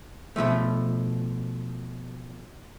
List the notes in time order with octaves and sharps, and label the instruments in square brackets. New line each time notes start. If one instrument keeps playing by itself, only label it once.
[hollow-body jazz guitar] B2 E3 F3 A3